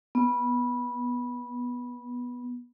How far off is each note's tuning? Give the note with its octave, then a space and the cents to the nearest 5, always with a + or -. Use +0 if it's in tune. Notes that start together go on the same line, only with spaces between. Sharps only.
B3 -15